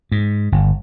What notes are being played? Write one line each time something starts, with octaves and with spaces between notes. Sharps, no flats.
G#2
G1